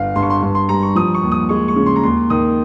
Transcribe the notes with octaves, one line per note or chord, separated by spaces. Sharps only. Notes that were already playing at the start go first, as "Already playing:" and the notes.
Already playing: G1 F5
G2 C6
C#6
C6
G2 C6
C6
G3 A#5
C#6
F3 D#6
C#6
D#2
D#6
G#3 C#6
C#6
C#3
C6
A#5
D#2 C6
D#3 D#6